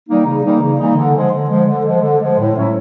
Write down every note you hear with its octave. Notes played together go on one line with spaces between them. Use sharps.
E3 G3 A#3 D#4
C#3
E3 G3 A#3 D#4
C#3
E3 G3 A#3 D#4
D3
F3 G#3
D3
F3 G#3
D3
F3 G#3
D3
F3 G#3
A2
F#3 A3 C#4 E4